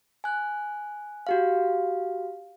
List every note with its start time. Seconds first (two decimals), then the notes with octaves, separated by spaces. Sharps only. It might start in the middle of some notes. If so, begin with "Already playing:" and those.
0.24 G#5 F#6
1.27 F#4 G4 F5